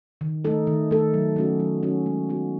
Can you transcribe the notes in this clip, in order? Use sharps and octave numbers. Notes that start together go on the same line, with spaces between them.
D#3
A3 D#4 A4
D#3
A3 D#4 A4
F#3
A3 C#4 F#4
F#3
A3 C#4 F#4
G#3
B3 D#4 F#4